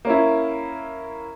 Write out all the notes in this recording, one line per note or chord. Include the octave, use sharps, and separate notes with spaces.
A#3 C#4 E4